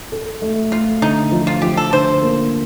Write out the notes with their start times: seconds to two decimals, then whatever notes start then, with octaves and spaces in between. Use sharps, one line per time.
0.12 A4
0.42 A3
0.72 A3 F4
1.02 D3 D#4
1.32 F3
1.47 F4
1.62 F3 G4
1.77 A4
1.93 D3 C5
2.22 A#3